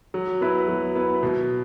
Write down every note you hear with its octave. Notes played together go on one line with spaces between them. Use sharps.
F#3
B3 E4 B4
F#3
B3 E4 B4
B2